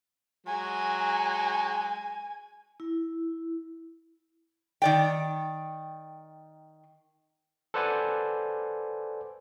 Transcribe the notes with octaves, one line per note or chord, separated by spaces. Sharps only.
F#3 G#3 G#5
E4
D#3 D5 G5
A4 B4 C5 D5 F#5 G#5